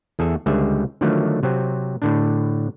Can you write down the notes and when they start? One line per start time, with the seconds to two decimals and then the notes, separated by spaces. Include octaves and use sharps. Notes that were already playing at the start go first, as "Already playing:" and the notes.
0.19 E2 G#4 A4 E5
0.46 C#2 D3 G3 G#4 E5
1.01 D3 D#3 F3 F#3 A3
1.43 C3 F#3 C4
2.02 A2 D3 D4